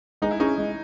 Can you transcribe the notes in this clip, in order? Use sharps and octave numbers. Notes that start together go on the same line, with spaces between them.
G#3 D#4
E4
C#4 D#4 G#4
G#3